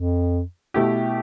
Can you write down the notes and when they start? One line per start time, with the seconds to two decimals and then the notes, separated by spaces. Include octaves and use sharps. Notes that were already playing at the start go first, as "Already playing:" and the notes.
Already playing: F2
0.74 B2 A3 E4 G4